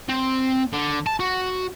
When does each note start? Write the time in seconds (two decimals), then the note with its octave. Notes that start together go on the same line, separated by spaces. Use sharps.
0.09 C4
0.73 D3
1.06 A5
1.20 F#4